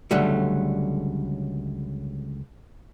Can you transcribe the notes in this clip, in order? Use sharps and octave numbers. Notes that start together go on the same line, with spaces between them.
C#2 D3 F#3 G3 A3